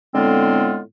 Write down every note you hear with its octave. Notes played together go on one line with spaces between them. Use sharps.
A2 D3 G#3 B3 C4 F4